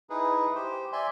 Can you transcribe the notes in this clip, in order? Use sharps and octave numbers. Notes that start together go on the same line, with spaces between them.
D#4 E4 G#4 B4
G4 C5
D5 E5 G#5 C6